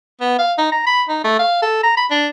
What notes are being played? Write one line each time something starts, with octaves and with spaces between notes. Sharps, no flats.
B3
F5
D#4
A#5
B5
D#4
A3
F5
A4
A#5
B5
D4